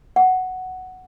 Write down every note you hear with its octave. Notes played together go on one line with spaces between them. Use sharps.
F#5